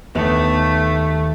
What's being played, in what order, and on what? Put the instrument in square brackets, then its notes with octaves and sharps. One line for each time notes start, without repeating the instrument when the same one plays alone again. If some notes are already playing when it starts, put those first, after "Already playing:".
[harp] D#2 [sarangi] A3 [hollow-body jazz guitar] B3